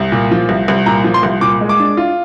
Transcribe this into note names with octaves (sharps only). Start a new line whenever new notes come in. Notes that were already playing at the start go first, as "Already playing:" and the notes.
Already playing: C2
A#2
F3
C2
C2
A#2 A#5
F3
C6
C2
A#2 D6
G#3
D6
D4
F4